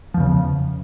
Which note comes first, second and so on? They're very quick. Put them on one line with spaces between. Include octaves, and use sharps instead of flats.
F3 E2 C#3